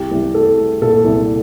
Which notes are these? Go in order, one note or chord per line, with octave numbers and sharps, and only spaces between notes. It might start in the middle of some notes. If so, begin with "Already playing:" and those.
Already playing: C2 G4
C2
A3 A4
A3
A#2 A4
C2